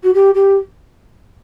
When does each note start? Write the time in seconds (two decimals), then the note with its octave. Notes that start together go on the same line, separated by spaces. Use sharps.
0.03 F#4
0.13 G4
0.34 G4